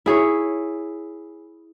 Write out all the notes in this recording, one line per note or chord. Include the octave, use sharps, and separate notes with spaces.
E4 G#4 C#5